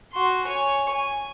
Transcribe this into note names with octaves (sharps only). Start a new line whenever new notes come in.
F#4 C6
C#5 G#5
G#5